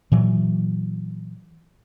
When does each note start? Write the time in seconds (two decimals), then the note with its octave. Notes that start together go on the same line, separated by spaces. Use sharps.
0.12 A#2 E3 F#3